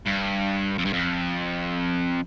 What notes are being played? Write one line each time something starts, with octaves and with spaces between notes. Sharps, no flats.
G2
F2
G2
F2